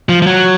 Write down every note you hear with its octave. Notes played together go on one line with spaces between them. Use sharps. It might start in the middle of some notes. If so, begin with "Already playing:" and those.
F3
F3
F#3